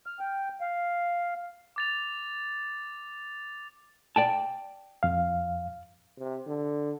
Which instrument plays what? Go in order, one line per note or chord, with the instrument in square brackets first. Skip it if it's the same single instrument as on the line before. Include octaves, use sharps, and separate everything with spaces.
[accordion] F6
G5
F5
[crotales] D6 A6 F7
[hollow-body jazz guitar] D5 G5 A5
[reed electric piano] F2 F5
[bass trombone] C3
D3